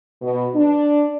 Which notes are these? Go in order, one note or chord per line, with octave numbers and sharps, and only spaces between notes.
B2
D4